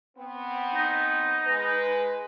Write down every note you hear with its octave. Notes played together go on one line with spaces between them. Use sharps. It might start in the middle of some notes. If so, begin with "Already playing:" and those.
B3 C4
D#4
G#3 B4